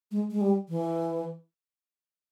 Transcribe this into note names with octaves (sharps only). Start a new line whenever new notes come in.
G#3
G#3
G3
E3